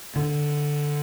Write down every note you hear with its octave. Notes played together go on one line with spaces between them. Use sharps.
D3